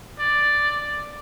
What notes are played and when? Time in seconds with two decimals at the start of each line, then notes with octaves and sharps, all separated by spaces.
0.19 D5
0.81 D5